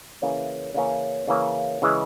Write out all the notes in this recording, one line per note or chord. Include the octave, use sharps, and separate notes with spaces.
C#3 E3 A#3 C#4
C#3 E3 A#3 C#4
C#3 E3 A#3 C#4
C#3 E3 G#3